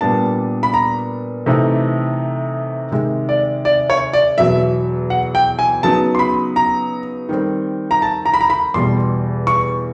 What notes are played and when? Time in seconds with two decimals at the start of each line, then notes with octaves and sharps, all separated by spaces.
0.01 A#2 G3 B3 D4 A5
0.63 B5
0.74 A#5
1.46 C3 E3 A3 C4 D#4
2.92 C3 D#3 G#3
3.29 D5
3.65 D5
3.90 C#5
4.13 D5
4.38 E2 B2 F#3 E5
5.10 F#5
5.35 G5
5.59 G#5
5.83 C#3 F#3 B3 D#4 A5
6.15 C6
6.19 B5
6.56 A#5
7.29 D#3 G3 C4
7.91 A#5
8.02 A5
8.26 A#5
8.34 B5
8.41 A#5
8.50 B5
8.74 E2 B2 G3 C6
9.47 C#6